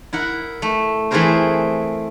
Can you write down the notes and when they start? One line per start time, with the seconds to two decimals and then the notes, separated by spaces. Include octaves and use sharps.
0.13 E4 A#4 F#5
0.62 A3
1.11 E3 A3 C4 G#4 A#4 C5